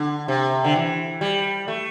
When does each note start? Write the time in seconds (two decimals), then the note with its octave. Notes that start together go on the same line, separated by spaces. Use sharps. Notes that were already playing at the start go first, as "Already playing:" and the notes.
Already playing: D3
0.28 C3
0.64 D3
0.76 E3
1.21 G3
1.68 A3